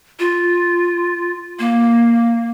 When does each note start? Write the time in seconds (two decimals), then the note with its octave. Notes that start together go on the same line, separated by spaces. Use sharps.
0.19 F4
1.59 A#3